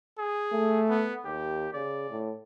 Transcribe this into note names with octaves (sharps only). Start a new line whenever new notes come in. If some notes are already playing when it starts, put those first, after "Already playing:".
G#4
A3
B3
D#2 G4
C#3 D5
A2